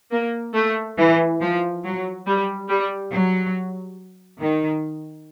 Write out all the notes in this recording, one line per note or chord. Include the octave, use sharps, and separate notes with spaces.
A#3
A3
E3
F3
F#3
G3
G3
F#3
D#3